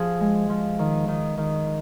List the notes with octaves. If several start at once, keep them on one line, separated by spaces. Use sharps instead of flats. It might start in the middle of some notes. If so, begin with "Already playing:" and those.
Already playing: F3 G#4
G#3
F3
D#3
D#3
D#3